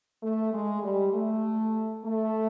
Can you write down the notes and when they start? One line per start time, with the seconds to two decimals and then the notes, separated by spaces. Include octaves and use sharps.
0.23 A3
0.53 G#3
0.83 G3
1.13 A3
2.04 A3